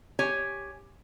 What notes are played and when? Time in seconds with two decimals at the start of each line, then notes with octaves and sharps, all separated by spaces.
0.19 G4 C#5 G#5